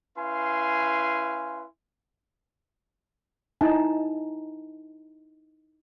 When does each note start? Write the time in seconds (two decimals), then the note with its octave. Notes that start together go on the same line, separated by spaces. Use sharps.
0.17 C#4 E4 B4 F5 G#5 C6
3.61 D#4 E4 G#5 A5